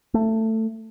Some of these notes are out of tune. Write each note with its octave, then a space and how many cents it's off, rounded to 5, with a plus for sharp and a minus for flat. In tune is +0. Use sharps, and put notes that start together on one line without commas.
A3 +15